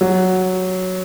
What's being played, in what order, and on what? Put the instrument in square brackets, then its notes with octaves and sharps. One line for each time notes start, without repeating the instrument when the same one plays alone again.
[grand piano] F#3